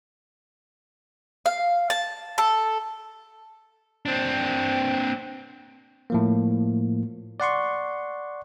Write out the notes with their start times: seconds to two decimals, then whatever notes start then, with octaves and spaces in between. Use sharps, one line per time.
1.46 F5
1.90 A5
2.38 A4
4.06 C4 D4
6.10 A2 F3 A#3
7.40 D5 F#5 C6 C#6